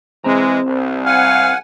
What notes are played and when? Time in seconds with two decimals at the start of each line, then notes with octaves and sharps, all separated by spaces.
0.24 E3 G#3 C4 C5 A#5
0.65 C2
1.06 F5 F#5 G#5